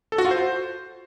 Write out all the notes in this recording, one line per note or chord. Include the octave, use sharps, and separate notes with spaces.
A4
F#4
F4
C5